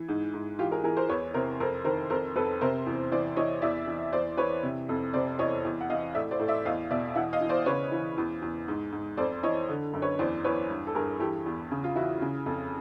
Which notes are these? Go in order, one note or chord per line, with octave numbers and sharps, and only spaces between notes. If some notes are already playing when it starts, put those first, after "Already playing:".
Already playing: E3
G#2
G#2
E3 F4 G4
G#4 A#4
E3 G#4 A#4
A#4 C5
E2 B4 C#5
C3 A#4 C5
F2 A#4 C5
D#3 A#4 C5
F2 A#4 C5
F2 A4 B4
C3 A#4 C5
E2
E3 C5 D5
E3 C#5 D#5
E2 D5 E5
E3
E2 C5 D5
E3 B4 C#5
C3
F2
C3 C5 D5
E2 C#5 D#5
E2
F#5
E3 D#5 F5
A2 D5 E5
C5 D5
A2
D5 E5
E2 D#5 F5
B2 D5 E5
E3 E5 F#5
D#5 F5
E3
C5 D5
C#3 B4 C#5
E3
E2
E2
G#2
G#2
F2 C5 D5
E3 C#5 D#5
D3
F#2
B4 C#5
E2 C5 D5
E2 B4 C#5
G2
A4
G2 G#4 A#4
E3 G4 A4
E2
C#3
F4
E3 E4 F#4
C#3
F2